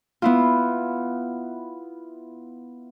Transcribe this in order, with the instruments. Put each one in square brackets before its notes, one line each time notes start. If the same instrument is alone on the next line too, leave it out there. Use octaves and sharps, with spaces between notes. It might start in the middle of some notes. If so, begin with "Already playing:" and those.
[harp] B3 E4 F4